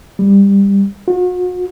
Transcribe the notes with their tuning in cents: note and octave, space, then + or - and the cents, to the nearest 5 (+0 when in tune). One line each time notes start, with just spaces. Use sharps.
G3 +20
F#4 -40